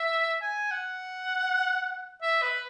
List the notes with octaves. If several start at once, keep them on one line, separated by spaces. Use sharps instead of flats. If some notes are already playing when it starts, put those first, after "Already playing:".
Already playing: E5
G#5
F#5
E5
B4